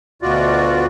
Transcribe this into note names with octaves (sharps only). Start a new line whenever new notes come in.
D2 B2 F4 F#4 D5